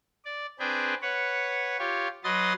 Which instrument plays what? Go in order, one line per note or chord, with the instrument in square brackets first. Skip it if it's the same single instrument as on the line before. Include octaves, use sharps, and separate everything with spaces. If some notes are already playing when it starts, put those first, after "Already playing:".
[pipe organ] D5
C4 D4 G#4 B4 G5
B4 C#5 F#5
F4 G4 C#5
F#3 B4 D#5 C6 D#6 A6